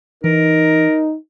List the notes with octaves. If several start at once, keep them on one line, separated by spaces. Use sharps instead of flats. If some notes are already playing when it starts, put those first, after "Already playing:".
E3 D#4 A#4